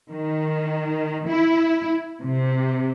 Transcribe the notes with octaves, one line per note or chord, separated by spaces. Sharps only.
D#3
E4
C3